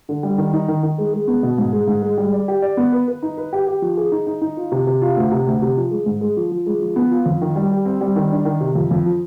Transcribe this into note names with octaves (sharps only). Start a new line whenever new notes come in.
D3
G3
D#3
D#4
D#3
D#3
G#3
G#3
B3
B2
G#2
G#3
G#2
G#3
G3
D5
G4
D5
B3
B4
B4
D#4
B4
G4
G4
F3
G#4
D#4
D#4
D#4
F4
C3
C3
F4
D2
C3
D2
C3
F3
G#3
G#2
G#3
F3
F3
G#3
F3
B3
F4
F2
D#3
G3
G4
C4
G3
D#3
D4
D#3
C3
F2
F2
F3